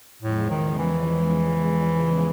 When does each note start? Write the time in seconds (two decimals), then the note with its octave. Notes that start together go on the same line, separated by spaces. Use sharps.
0.21 E2 A2 C#3 F3 G#3
0.50 D#3
0.79 E3